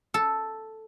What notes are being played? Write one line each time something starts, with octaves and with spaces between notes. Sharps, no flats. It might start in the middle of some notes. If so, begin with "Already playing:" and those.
A4